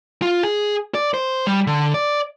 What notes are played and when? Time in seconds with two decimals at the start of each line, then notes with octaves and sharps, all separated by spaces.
0.22 F4
0.43 G#4
0.94 D5
1.14 C5
1.47 G3
1.67 D3
1.94 D5